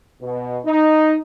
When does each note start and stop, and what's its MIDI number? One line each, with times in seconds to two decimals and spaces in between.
0.21 0.58 47
0.65 1.16 63